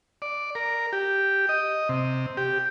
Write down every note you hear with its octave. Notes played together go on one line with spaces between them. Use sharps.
D5
A#4
G4
D#5
C3
G4